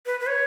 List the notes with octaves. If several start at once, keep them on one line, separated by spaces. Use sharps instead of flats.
B4
B4
C#5